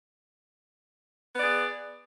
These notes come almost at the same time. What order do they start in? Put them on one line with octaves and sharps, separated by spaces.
B3 D5 G#4